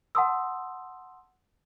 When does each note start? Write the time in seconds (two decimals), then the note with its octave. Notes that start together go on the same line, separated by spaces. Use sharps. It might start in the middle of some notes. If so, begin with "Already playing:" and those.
0.15 F#5 A5 C6 D#6 E6